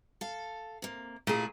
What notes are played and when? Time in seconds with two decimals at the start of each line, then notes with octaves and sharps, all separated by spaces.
0.21 A4 F5
0.82 C3 A#3
1.27 A#2 A3 E4 G4 G#4